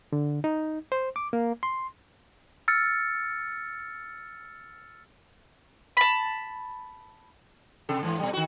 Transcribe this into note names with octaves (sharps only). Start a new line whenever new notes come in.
D3
D#4
C5
D6
A#3
C6
E6 F6 A6 C#7
A5 B5
C3 A4
G#2 E3
B2 G3
D#3 F#4